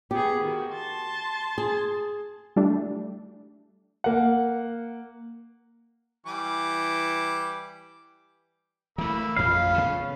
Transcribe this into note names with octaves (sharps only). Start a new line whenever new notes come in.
B3 G4 G#4
D#3 F#4
A5 C6
G#4
G3 A3 D4
A#3 F#5
E3 G3 D6
E3 A3 A#3 B5 E6
A1 F2 C#4 F4 F5 B5
C#3 B3